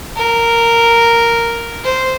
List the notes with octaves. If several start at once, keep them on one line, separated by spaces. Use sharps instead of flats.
A#4
C5